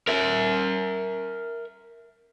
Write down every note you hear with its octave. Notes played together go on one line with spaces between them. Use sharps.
A#4 E5